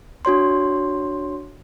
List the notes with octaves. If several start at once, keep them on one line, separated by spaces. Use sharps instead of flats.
D4 F#4 C#5 C6